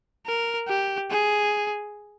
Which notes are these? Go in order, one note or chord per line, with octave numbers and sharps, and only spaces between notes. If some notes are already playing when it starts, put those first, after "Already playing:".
A#4
G4
G#4